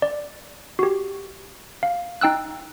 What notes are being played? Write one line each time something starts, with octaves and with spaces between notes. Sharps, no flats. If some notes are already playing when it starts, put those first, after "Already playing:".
D5
F#4 G4
F5
D#4 G5 E6 F#6